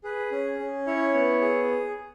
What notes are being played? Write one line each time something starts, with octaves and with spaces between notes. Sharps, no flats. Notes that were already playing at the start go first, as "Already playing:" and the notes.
G#4 B4
C#4
C#4
E4 C#5
B3
G#4